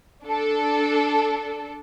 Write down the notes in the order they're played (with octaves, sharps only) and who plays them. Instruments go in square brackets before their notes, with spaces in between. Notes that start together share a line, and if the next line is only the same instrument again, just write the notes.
[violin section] D4 A4